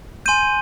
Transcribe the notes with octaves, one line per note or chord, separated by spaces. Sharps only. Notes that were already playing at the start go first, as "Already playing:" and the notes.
G#5 C6 G6 D#7